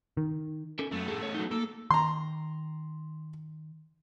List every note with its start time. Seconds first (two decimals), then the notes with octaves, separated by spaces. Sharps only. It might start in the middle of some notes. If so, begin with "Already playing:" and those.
0.17 D#3
0.79 C#4 A4 A#4
0.92 F#2 A3 B3
1.08 A2 G#4 A4
1.23 C#5
1.35 F#3 D#4
1.51 A#3 A4
1.91 D#3 A#5 C6